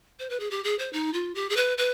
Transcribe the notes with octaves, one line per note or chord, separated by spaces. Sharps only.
C5
B4
G#4
G4
G#4
C5
D#4
F4
G4
G#4
B4
B4